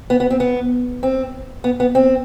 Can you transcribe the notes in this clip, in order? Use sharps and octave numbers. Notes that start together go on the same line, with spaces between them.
B3
B3
C4
B3
C4
B3
B3
C4